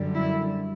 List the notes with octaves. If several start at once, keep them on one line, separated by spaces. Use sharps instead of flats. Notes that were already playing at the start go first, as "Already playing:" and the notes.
Already playing: F#2 D3 G3
E4